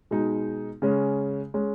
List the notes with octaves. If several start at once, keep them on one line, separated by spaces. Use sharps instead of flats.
B2 G#3 D#4
C#3 G#3 C#4
G#3 C#4